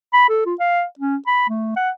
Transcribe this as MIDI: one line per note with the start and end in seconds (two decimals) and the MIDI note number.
0.13 0.29 83
0.29 0.44 69
0.46 0.54 65
0.60 0.84 77
0.99 1.16 61
1.27 1.48 83
1.49 1.75 57
1.76 1.90 78